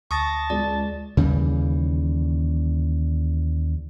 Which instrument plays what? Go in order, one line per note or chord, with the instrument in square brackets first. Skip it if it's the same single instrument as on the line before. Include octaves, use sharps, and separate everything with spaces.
[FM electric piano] D2 [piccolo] A5 [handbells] C#6 D#6 A#6
[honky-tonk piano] C#2 [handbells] D5
[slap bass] D#2 C#3 E3 G3